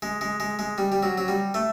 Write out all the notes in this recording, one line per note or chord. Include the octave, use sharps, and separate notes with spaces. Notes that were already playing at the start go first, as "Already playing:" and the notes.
G#3
G#3
G#3
G#3
G3
G3
F#3
F#3
G3
A3